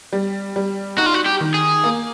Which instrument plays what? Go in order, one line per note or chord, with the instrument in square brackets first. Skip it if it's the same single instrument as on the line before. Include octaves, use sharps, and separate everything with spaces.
[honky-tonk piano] G3
G3
[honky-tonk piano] D#4 [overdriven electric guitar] F#4
[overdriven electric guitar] F4
F#4
G4
[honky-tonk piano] D#3
[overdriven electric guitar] G#4
[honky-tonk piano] A#3